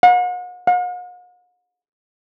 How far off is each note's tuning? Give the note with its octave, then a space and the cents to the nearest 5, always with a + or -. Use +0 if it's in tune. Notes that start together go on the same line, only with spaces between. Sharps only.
F#5 -40
F#5 -45